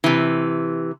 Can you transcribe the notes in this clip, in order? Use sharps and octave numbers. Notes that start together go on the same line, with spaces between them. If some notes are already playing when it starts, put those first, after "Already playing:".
C3 E3